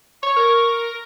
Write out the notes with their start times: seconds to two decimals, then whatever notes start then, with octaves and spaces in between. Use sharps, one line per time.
0.23 C#5 C#6
0.36 A#4